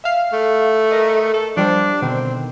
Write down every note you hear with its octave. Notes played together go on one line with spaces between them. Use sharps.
E5 F5
A3
A#4 D#5
A4
F3 G3 D4 C5
B2 D3 D#3 C4